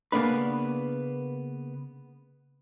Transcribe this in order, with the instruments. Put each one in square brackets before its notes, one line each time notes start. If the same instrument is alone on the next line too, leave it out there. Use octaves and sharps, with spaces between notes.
[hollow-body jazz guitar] C#3 A#3 B3 D4 B4